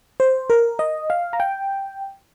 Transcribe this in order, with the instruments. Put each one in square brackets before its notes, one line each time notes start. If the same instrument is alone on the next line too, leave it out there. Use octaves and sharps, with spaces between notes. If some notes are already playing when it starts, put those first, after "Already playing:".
[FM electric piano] C5
A#4
D#5
F5
A#5
G5